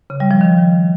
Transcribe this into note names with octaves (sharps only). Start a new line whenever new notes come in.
C#3
G3
F3
D#3